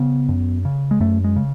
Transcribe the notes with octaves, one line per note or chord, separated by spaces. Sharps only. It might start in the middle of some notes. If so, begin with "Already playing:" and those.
Already playing: C#3 B3
F#2
C#3
G#3
F#2 A3
G#3
C#3